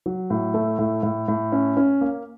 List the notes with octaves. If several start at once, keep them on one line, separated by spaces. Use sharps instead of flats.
F#3
A2
A3
A2
A2
A2
C#4
C#4
A#3